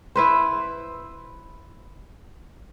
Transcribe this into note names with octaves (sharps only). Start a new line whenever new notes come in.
E4 B4 C5